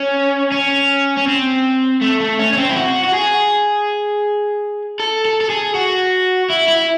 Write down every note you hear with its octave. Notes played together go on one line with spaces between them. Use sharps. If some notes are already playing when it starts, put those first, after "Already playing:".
Already playing: C#4
C#4
C#4
C4
A3
A3
C#4
C#4
C4
E4
F#4
F#4
G#4
A4
A4
A4
G#4
F#4
E4
E4